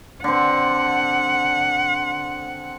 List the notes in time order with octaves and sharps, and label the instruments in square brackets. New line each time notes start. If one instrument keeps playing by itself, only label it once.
[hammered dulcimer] D3 C4 [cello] F#5